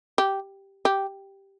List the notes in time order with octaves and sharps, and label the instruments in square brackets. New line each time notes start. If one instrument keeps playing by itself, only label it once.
[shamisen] G4
G4